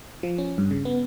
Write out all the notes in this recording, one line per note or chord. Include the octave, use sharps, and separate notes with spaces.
F3
C#4
G2
C#3
B3